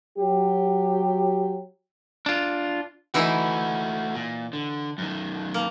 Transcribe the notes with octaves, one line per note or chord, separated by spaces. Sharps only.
F#3 G4
D4 F4
E3 A3 D#4 E4 F#4
A#2
D3
F#2 D#3
A#3